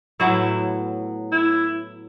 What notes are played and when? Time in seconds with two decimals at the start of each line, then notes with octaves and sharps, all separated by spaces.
0.20 A2 F#3 B3 E4
1.32 E4